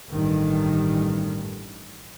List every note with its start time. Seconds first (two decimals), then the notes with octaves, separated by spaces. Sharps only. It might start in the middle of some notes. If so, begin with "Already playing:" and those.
0.12 A1 G2 D#3